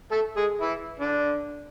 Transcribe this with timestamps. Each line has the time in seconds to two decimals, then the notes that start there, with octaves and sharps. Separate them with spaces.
0.11 A3 A4
0.37 G#3 G#4
0.61 E3 E4
0.99 D3 D4